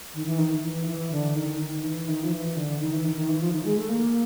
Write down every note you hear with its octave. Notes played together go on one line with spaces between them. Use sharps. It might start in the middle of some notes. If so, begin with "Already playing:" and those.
D#3
E3
D#3
E3
E3
D3
D#3
D#3
E3
D#3
F3
E3
D3
D#3
E3
D#3
D#3
E3
F3
D#3
G#3
A3
A#3